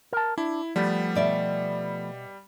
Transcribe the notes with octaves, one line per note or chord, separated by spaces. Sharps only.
A#4 A5
D4 E4
F3 G3 A3 B3
B2 D5 E5